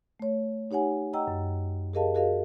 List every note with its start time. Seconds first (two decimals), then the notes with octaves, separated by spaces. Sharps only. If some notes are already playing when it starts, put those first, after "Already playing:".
0.20 A3 C#5
0.71 D#4 G4 C#5 F#5 G#5
1.13 D#5 F#5 G5 A#5 E6
1.28 F#2
1.94 G4 G#4 A#4 D#5 F5 A5
2.15 F#4 G#4 A#4 D#5 F5